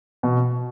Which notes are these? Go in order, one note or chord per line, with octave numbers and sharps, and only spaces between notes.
B2